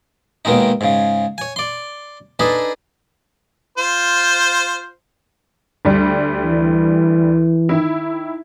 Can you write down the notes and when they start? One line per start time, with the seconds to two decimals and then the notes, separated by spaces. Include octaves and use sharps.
0.45 D#2 B2 D#3 G#3 D#4
0.81 G#2 C#3
1.38 C#5 G#5
1.56 D5 C6
2.39 D4 D#4 G#4 A4 B4
3.78 F4 C5
5.85 D2 G3
6.44 E3
7.69 D#3 E4